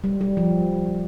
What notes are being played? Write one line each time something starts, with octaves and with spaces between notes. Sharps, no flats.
G3
G3
F3